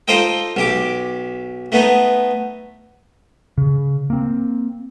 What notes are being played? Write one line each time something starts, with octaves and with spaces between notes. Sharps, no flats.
D#4 F4 A4 C5 D#5 G5
B1 G4 D6
A3 B3 D#4
C#3
A#3 C4